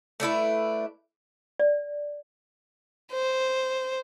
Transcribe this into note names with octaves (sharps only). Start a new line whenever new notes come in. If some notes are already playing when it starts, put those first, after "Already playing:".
A3 D4 E4 B4
D5
C5